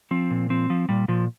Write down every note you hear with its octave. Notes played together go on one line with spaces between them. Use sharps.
F3 C4
A#2
F3 C4
F3
A#2 G3
A#2 F3